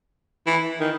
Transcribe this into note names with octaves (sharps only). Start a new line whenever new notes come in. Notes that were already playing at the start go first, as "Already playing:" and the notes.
E3
D#3